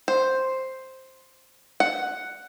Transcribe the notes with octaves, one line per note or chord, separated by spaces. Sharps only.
C5
F#5